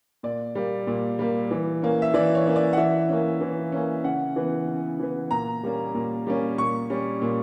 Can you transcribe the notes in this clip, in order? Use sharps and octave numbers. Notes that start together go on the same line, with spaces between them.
A#2 D5
G3 A#3
A#2
G3 A#3
E3
A#3 C#4
E5
E3 D5
C#5
A#3 C#4
D5
F#5
E3 E5
A#3 C#4
E3
A#3 C#4
C#3 F#5
E3 B3
C#3
E3 B3
A#2 A#5
G3 A#3 C#4
A#2
G3 A#3 C#4
A#2 C#6
G3 C#4
A#2